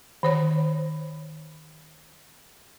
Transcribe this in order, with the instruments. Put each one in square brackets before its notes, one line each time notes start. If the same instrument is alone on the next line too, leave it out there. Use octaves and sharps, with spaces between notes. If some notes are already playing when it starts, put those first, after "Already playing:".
[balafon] D#3 C5 C#5